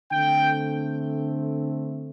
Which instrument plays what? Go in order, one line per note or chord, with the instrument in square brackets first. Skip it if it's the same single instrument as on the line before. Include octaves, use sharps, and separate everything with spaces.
[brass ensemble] D3 A3 C4 G5